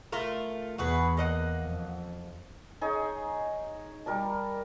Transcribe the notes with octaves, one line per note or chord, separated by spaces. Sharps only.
A3 F4 A#4
E2 F#4 G#4 B4
A#3 D#5 F#5
F2
D#4 G#4 C#5
G3 A#4 D5 A5